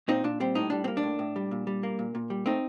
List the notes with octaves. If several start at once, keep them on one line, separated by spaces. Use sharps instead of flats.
A#2 C4 D#4
A#2 D4
G3 C4
A2 D#4
G3 D4
C4
A#3
D4
A2
A2
G3
A#2
G3
A#3
A#2
A#2
G3
A3 C4 D#4